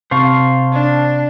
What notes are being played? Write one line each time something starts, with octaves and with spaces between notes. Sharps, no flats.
C3 C5 F5 A5 C#6
D4